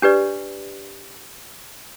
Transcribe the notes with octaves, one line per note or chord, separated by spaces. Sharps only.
D4 G4 B4 D5